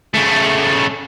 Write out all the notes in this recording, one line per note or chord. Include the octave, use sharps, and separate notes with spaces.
C#3 A3